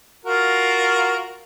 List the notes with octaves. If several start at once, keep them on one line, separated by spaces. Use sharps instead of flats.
F4 F#4 A#4